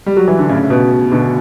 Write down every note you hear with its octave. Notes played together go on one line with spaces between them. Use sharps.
G3
F#3
E3
D3
A2 C#3
B2
B2 D3